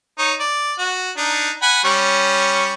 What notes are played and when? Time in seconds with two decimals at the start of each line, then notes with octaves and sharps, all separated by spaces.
0.19 D#4 C#5
0.40 D5
0.78 F#4
1.17 D4 D#4
1.62 F#5 G#5 B5
1.84 G3 C#4 C#6